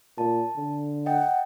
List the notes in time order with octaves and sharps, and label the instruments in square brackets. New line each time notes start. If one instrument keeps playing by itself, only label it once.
[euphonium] A#2 [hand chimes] A5
[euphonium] D3
[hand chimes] D#5 G5 [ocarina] F#5